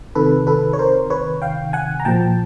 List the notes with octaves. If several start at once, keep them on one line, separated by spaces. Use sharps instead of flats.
C3 D#3 A4 B4
A4 B4
C#5
A#4 C5
B4 C#5
F5 G5
F#5 G#5
A#5
A#2 F3 G5 A5